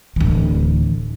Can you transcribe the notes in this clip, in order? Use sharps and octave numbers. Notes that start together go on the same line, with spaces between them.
D1 E3